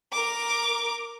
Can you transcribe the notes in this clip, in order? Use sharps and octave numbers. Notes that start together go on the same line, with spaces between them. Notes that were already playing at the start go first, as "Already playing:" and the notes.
A#4 D6